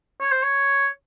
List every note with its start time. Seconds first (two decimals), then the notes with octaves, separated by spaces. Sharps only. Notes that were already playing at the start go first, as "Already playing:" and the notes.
0.21 C#5
0.32 C5
0.43 C#5